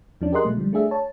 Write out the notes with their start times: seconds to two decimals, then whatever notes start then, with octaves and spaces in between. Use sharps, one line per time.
0.21 E2 F3 C#4 D4
0.33 G4 G#4 A#4 D#5 C6 F#6
0.45 B2 F#3 G#3 A3
0.57 D3 F3 G3
0.73 A3 D4 G#4 E5
0.91 C#5 A5